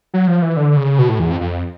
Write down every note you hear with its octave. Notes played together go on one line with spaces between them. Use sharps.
F#3
F3
E3
D3
C#3
B2
A2
E2
F2
F2